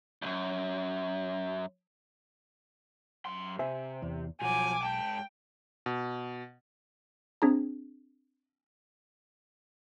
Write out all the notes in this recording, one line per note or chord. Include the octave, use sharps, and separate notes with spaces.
C2 F#2
F#2 C6
C3 C5 E5 G#5
E2
B1 F3 F#4 G#5 D6
G#2 G5 A5
B2
C4 D4 G#4 A#5